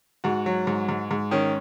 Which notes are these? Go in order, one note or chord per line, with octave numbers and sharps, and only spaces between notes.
G#2 F#4
F#3
G#2
G#2
G#2
D#3 C#4